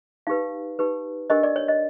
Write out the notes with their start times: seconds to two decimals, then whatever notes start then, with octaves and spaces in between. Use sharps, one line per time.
0.27 D#4 G4 B4 F5
0.79 D#4 G4 B4
1.30 D4 G4 A#4 D#5
1.43 D5
1.56 C#5
1.68 D#5